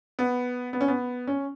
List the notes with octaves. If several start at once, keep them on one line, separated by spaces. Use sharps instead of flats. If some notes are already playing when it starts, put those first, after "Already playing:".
B3
B3
C#4
B3
C#4